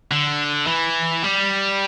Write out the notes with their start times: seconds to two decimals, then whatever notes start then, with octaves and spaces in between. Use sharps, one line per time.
0.11 D3
0.68 E3
1.24 G3